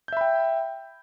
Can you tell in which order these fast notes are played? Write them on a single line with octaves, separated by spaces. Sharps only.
G6 E5 B5 G5